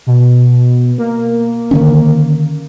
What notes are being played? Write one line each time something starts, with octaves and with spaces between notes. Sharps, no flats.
B2
A#3
D3 D#3 C#4